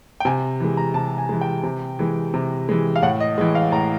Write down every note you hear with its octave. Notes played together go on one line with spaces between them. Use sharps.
G5
C3 G#5
E3 G#3
A#5
C3 A5
G#5
E3 G#3
G5
C3
E3 G#3
C3
E3 G#3
F5
A2 F#5
D#5
E3 G#3
F5
A2 A#5